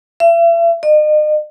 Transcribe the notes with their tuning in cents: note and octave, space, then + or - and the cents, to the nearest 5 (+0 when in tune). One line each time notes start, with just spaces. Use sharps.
E5 +40
D#5 -40